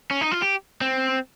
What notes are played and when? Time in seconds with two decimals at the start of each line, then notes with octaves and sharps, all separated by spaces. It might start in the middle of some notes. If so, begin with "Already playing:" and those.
0.11 C#4
0.21 D#4
0.31 F4
0.42 G4
0.81 C4